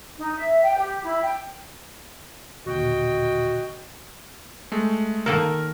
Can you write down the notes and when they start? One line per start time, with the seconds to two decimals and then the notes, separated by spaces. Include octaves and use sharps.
0.18 D#4
0.34 E5
0.61 G5
0.76 G4
1.03 E4
1.21 G5
2.66 D#2 A#2 D3 F#4 D#5 G5
4.72 G#3 A3
5.26 D#3 A#3 A4 A#4